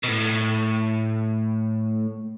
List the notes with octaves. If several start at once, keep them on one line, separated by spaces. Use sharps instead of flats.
B2
A2